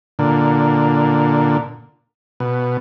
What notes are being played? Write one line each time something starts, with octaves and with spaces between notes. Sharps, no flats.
A#2 D3
B2